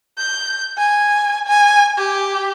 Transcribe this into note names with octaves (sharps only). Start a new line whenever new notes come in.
G6
G#5
G#5
G4